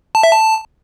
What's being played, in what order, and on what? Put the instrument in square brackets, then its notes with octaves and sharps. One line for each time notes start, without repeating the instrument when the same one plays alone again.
[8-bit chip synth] A5
E5
A5